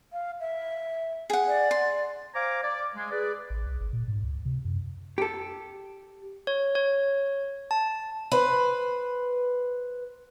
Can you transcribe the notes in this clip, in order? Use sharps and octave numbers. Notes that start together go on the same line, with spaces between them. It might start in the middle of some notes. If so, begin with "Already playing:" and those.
F5
E5
G#4 F#5
D5
C6
C5 F5 G#5 A#5 D6
D5
G#3
G#4 B4 D5
A1
C2
G#1
A#2
G#2
C#2
C3
F#2
G4 A4
C#5
C#5
A5
B4 C5